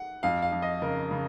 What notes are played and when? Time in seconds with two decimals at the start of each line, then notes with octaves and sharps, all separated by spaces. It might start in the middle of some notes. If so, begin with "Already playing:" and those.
Already playing: F#5
0.23 F2 F5
0.42 F5
0.52 F2
0.62 D#5
0.82 C#3 A#4
1.11 C#3